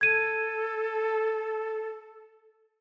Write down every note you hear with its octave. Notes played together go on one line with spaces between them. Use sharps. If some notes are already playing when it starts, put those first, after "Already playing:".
A4 G#6 D#7